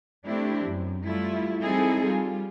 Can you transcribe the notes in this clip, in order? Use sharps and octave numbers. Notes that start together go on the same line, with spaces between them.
A3 C4 D4 E4 G4
F#2
G3 A3 E4 F4
G3 C4 D#4 E4 G#4 A4
G3 F4